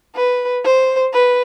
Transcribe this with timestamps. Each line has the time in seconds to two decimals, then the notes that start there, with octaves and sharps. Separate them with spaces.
0.15 B4
0.65 C5
1.14 B4